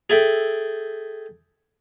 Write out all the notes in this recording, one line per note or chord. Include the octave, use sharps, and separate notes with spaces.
G#4 A4 E5 G5